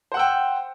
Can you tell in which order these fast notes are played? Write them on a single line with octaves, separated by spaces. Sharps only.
C5 F#5 E6 G5